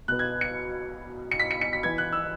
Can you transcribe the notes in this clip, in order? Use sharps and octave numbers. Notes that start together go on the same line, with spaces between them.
B2 B3 F#6
G#6
C#7
C#7
B6
C#7
C#7
B6
E3 B3 G#6
F#6
E6